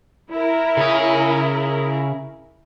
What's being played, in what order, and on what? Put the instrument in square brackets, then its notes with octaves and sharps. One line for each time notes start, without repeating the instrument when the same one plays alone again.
[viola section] E4 A#4
[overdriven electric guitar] C#3 G#4